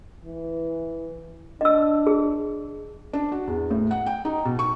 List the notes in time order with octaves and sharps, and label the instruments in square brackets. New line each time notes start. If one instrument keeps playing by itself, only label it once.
[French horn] E3
[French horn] D4 [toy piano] D#5 E6
[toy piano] G#4
[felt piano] D4
F#4
E2
A2
F#5
G5
D#4
B2
C#6